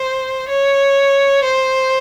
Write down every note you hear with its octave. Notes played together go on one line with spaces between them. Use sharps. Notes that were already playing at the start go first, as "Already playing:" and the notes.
Already playing: C5
C#5
C5